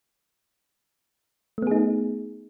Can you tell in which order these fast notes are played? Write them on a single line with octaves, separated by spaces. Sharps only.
A3 B3 G#4 D#4